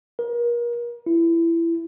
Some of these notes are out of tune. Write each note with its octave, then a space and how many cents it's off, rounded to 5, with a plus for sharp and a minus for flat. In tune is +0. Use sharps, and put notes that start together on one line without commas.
A#4 +35
E4 +20